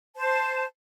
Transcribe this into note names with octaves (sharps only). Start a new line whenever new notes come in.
C5 A5